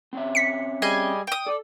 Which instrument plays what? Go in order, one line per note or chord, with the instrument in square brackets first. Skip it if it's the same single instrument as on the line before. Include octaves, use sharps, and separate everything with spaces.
[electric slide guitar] C4 C#4 E5
[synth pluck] B6 C#7
[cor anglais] G3 [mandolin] G#4 D#5 G#5
[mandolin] G5 D#6
[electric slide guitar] A4 [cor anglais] D5